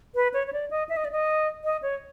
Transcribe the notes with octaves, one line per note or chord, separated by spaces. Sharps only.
B4
C#5
C#5
D5
D#5
E5
D#5
D5
D#5
D#5
C#5